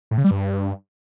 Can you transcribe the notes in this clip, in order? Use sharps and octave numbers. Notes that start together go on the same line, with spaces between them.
A2
C#3
G3
G2